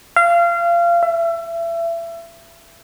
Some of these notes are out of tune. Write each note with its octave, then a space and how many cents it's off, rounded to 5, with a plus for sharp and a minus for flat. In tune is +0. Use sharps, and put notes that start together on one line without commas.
F5 -25
E5 +30